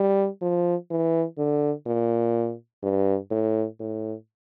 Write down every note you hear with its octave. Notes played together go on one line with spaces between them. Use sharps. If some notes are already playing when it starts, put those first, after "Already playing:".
Already playing: G3
F3
E3
D3
A#2
G2
A2
A2